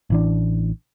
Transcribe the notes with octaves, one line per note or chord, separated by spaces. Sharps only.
A1 E3 D4